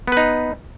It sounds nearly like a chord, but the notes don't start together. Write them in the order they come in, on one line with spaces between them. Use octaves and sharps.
B3 B4 D#4